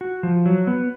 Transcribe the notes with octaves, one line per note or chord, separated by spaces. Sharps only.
F#4
F3
F#3
B3